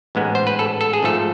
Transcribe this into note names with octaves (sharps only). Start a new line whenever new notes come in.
A1 G#2 G#3 B3
C5
B4
A4
A4
G#4
G#1 G#2 F3 A3 A4